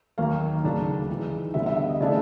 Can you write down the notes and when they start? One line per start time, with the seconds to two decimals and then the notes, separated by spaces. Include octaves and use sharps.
0.18 D#2 D#3 F#3 A#3 F5
0.64 D2 C#3 F#3 A#3 D4
1.08 G#2 E3 G#3
1.54 D2 D3 G3 B3 E5
1.66 E5
1.77 E5
1.89 D#5
2.01 C#3 E3 A3 D4 D5